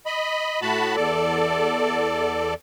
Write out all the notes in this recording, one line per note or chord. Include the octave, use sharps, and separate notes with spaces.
D#5 B5
A2 F#4 A5 B5
E2 A4 D5